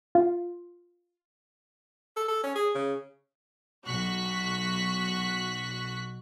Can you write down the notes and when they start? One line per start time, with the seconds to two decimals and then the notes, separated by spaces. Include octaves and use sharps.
0.15 F4
2.16 A4
2.28 A4
2.43 C#4
2.56 G#4
2.75 C#3
3.85 B1 F#4 C#6 F#6 B6